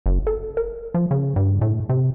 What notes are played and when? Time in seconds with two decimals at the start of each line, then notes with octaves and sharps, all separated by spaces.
0.06 F#1
0.27 A4
0.57 A#4
0.94 F3
1.11 C#3
1.36 G2
1.61 A2
1.89 C3